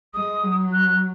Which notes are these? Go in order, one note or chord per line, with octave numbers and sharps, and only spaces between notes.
G#3 D#6
F#3
F#6